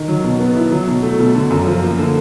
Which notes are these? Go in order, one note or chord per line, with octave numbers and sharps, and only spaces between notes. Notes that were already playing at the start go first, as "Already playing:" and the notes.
Already playing: D#3
F#3
B2
B3
E4
F#3
B2
A3
B2
D3
F#2
F3
A#3
D3